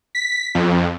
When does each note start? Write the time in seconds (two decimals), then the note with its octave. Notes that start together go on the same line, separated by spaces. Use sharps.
0.15 B6
0.55 F2